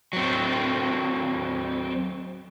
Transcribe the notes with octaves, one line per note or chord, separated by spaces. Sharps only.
F#3 C4